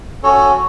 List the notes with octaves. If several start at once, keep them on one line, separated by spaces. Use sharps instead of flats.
C#4 F#4 A4 C#5